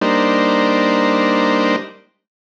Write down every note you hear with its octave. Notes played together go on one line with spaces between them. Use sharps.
G3 A#3 D4 D#4 C5